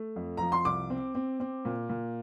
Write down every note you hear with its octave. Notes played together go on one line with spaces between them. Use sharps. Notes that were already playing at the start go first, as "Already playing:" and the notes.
Already playing: A3
F2
F3 A#5
C6
C2 D6
C4
C4
C4
A#2
A#2